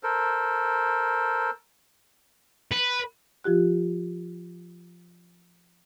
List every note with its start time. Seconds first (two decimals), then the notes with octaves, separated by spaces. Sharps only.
0.03 A4 A#4 C5
2.72 B4
3.44 F3 F4 G4 F#6